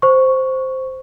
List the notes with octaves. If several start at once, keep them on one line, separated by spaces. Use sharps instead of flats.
C5 C#6